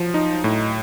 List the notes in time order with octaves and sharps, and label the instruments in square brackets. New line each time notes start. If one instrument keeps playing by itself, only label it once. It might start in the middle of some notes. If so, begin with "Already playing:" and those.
Already playing: [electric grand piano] F3 [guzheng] F#3
[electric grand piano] D#4
A2